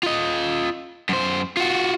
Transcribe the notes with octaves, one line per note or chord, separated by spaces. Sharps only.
F4 D#5
F#2 C5
F4 F#4